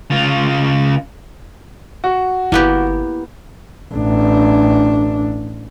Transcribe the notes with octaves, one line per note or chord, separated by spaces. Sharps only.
C#3 F4
F#4
G1 A#3 B3 E4 G4
A1 D4